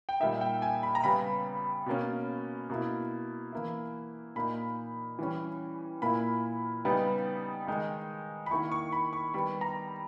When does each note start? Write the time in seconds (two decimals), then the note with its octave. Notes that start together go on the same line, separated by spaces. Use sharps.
0.09 G5
0.20 A#2 G3 A#3 D#4 E5
0.41 G5
0.62 G#5
0.83 B5
0.95 A#5
1.03 C#3 G3 B3 B5
1.86 B2 A#3 C#4
2.70 B2 A#3 E4
3.53 E3 A#3 E4
4.36 A#2 A#3 D#4 B5
5.19 E3 G3 C#4
6.02 A#2 A#3 E4 B5
6.85 C#3 G3 B3 D#4
7.67 D#3 G#3 D#4
8.46 B5
8.51 D#3 A#3 E4 C#6
8.72 C#6
8.92 B5
9.13 C#6
9.34 D#3 G3 B3 B5
9.61 A#5